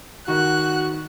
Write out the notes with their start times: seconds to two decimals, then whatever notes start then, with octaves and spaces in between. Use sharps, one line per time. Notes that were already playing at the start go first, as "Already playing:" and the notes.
0.28 D#3 F#4 F#6